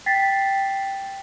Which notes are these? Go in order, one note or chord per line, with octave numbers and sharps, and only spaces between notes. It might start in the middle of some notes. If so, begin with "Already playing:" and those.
G5 A6 B6 C7